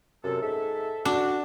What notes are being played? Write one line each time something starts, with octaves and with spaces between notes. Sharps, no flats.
F#2 C3 A4
G#2 A4 E5
D4 F#4